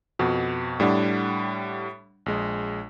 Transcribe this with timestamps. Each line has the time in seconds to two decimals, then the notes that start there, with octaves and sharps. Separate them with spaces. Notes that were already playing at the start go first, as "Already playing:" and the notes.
0.19 F2 B2 F#4
0.80 A2 G3 D4 F#5
2.26 A#1 G#3